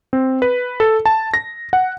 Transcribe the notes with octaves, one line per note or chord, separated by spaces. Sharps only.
C4
B4
A4
A5
A#6
F#5